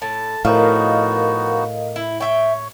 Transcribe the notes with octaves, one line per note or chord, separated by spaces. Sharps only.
A2 A5
A2 F3 B3 D#4 F#4 A#4 D#5 F5
E4
C#5 E5 G5